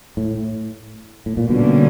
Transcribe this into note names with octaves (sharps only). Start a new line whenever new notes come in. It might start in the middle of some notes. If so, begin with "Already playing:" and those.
A2
A2
A#2
B2 D3 G3 A#3 C#4